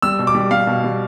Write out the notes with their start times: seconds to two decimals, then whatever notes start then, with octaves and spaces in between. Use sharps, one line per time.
0.02 G3 E6
0.19 B2
0.27 D6
0.35 G3
0.51 G3 F5
0.67 B2
0.84 G3